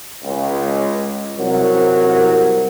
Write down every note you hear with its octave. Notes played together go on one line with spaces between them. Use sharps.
C#2
C2 F#3 A#4